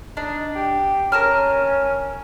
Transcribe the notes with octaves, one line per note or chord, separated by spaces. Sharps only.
D4 D#4
G4
C#4 A#4 A5 F6